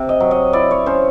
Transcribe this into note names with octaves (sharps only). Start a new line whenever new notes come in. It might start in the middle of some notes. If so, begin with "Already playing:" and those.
Already playing: C3
D#5
F#3
D#5
E4 D5
C#5
C#4 C5